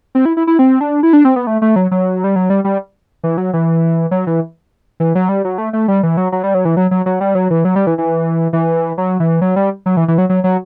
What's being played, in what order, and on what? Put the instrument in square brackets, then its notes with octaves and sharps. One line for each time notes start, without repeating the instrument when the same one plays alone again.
[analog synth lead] C4
E4
E4
E4
C4
D4
E4
D4
C4
B3
A3
A3
F#3
F#3
G3
F#3
G3
G3
E3
F#3
E3
F#3
E3
E3
F#3
G3
F#3
A3
A3
G3
E3
F#3
F#3
G3
F#3
E3
F#3
F#3
F#3
G3
F#3
E3
F#3
G3
E3
E3
E3
F#3
E3
F#3
G3
F#3
E3
E3
F#3
F#3
F#3